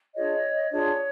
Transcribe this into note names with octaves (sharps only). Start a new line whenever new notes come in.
D4 F4 G#4 C#5 D#5
D4 F4 G#4 C#5